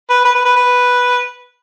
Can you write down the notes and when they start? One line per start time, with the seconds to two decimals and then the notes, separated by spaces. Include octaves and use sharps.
0.10 B4
0.25 B4
0.35 B4
0.45 B4
0.56 B4